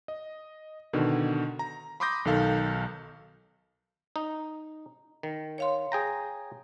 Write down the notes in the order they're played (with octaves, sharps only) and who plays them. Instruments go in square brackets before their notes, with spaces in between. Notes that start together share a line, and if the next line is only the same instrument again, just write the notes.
[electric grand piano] D#5
B2 D3 D#3
A#5
B5 C6 D6 D#6 G6 A#6
B1 D#3 A4 F5
[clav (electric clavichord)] D#4
D#3
[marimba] C#5 F5 C6
[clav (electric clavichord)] G#4 G5 A#5